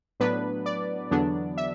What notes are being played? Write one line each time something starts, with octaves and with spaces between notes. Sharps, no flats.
A2 F#3 B3 D4 B4
D5
E2 D3 F#3 B3 D4
E5